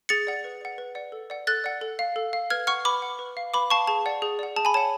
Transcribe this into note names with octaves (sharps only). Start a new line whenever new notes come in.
G#4 A6 C#7
D5 F#5
B4
D5 F#5
B4
D5 F#5
A4
D5 F#5
A4 F#6 A6
D5 F#5
A4
F5
A4
F5
B4 F6 G#6
F#5 C#6 F6
B4 B5 D6
F#5
B4
F5
B4 B5 D6
F5 A5 C#6
G#4 A5
D5 F#5
G#4
D5 F#5
G#4 A5
G#5 B5
C#5 F#5 A5